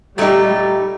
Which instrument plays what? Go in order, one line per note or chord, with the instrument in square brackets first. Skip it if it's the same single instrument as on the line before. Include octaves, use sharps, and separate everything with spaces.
[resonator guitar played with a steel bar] A#2 A3 D#4 G4 [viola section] G3